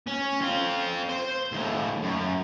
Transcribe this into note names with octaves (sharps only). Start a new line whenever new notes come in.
C#4
C4 F4
C5 C6
D#2 A2
F#2